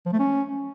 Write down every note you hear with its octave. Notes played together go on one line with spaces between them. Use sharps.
F3
A3
C#4